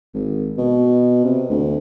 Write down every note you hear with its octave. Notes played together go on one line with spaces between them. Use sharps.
G#1
B2
C3
D2